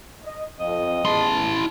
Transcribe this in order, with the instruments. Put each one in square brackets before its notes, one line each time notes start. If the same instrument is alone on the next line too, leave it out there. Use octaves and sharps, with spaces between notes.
[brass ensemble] D#5
[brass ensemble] F2 [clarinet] D#5
[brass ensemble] E2 G#3 A5 [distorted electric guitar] E4 C6